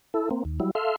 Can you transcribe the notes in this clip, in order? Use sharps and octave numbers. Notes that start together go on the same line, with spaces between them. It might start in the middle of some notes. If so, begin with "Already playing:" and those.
E4 A4
A#3 C4
D#2
F#3 G3 E4
A4 E5 F5 C6